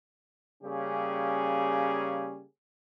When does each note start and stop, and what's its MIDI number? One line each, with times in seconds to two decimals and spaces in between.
0.64 2.44 49
0.64 2.44 55
0.64 2.44 58
0.64 2.44 61
0.64 2.44 67
0.64 2.44 68